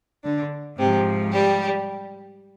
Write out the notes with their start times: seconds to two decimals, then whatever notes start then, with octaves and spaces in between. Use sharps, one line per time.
0.24 D3 D4
0.78 G#2 C3 F3 C4
1.33 G3 G4